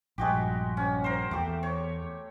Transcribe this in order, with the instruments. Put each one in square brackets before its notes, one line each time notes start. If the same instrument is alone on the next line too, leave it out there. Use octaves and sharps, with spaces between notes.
[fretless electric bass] A#1 G2 [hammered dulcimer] G#3 F#4 G4
[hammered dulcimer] C#4
A#4 C5
[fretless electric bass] E2 [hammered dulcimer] A3 G4
[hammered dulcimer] C#5